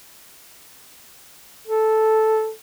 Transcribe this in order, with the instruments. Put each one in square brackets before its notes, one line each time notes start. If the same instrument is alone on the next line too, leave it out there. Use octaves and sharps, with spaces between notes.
[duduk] A4